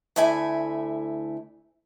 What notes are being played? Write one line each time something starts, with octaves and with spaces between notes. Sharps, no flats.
D2 A3 E4 E5 G#5